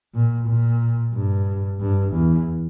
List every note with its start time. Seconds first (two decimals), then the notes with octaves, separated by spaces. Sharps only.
0.15 A#2
0.49 A#2
1.14 G2
1.80 G2
2.13 E2